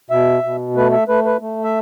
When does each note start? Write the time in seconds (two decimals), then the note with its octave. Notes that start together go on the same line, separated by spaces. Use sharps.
0.10 B2 E5
0.43 B2
0.76 A3 B4
0.92 E5
1.08 A3 B4
1.26 B4
1.41 A3
1.64 E5